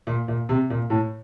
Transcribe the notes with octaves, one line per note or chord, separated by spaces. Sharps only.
A#2
A#2
C3
A#2
A2